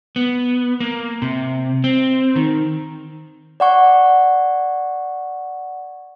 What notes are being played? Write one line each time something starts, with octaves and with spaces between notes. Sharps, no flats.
B3
A#3
C3
C4
D#3
D5 F#5 C#6